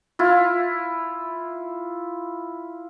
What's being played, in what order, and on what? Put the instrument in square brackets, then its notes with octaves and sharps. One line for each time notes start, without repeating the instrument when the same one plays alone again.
[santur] E4 F4